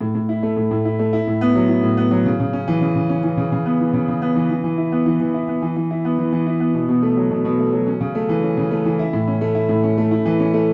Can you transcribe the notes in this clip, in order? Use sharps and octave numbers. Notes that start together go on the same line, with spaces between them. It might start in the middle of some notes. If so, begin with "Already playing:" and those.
A2
A2
E4
A3
A2
A2
E4
A3
E4
A2
B3
F#3
E4
A2
B3
F#3
C#3
C#3
C#4
E3
C#3
C#3
C#4
E3
C#3
C#3
B3
E3
C#3
C#3
B3
E3
E3
E3
E4
B3
E3
E3
E4
B3
E3
E3
E4
B3
E3
E3
E4
B3
B2
B2
A3
F#3
B2
B2
A3
F#3
C#4
C#3
A3
E3
C#4
C#3
A3
E3
E4
A2
C#4
A3
E4
A2
C#4
A3
E4
E3
C#4
A3